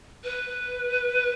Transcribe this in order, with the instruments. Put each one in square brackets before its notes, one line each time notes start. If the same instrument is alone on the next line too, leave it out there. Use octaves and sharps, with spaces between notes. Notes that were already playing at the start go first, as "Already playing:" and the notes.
[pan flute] B4